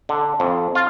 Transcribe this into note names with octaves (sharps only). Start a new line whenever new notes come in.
D3
F2
F4